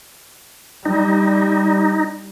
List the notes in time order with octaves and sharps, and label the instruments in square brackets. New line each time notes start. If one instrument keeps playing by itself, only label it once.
[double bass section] G3 [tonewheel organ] D#4